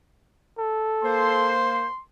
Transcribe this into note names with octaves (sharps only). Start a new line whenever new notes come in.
A4
A#3 C5 C6